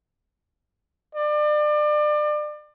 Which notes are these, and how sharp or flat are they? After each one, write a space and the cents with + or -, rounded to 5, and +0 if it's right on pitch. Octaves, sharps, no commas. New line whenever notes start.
D5 +30